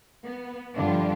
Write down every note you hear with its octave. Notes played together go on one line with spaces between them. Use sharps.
B3
G2 D3 F3 D4 F4 G4